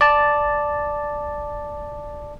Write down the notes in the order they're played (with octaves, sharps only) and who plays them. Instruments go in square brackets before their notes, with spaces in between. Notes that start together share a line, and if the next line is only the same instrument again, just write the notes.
[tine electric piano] D5 A5